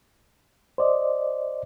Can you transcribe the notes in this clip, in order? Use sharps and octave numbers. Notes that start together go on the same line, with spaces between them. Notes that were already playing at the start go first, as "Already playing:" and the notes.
C5 D5 D#5